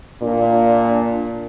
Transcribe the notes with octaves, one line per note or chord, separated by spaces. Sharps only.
A#2 D4